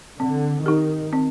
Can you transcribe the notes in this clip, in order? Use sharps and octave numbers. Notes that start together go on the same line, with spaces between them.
D3 C4
D#3 D#4 G4
C4